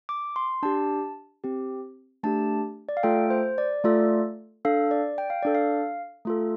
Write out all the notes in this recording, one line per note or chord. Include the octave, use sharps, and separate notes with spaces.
D6
C6
D4 G4 A5
C4 G4
A3 D4 G4 A5
D5
F5
A3 F4 A4 G5
C5
D5
A3 F4 A4 D5
D4 A4 F5
D5
G5
F5
D4 A4 D5
F5
A3 F4 A4